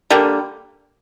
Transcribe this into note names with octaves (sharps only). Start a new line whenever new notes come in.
D3 G3 A#3